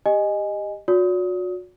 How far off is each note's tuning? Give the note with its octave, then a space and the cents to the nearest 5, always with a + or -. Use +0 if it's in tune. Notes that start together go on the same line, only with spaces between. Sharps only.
G4 +15 D#5 -10 G#5 +0
F#4 -35 D5 -45 D#6 +25